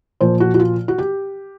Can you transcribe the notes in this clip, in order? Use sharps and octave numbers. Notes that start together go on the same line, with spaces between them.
A#2 F3 A#3 C5
F#4
F#4
F4
F#4
G4